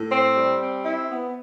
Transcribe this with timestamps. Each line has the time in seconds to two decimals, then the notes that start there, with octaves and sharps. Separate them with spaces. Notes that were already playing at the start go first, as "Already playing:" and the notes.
Already playing: A2
0.11 C4
0.36 G3
0.60 C4
0.84 E4
1.09 B3